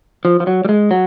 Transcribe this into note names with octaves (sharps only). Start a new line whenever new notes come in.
F3
F3
F#3
G3
G#3
F#3